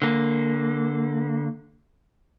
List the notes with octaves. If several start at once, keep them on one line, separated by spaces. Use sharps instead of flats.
D3 A#3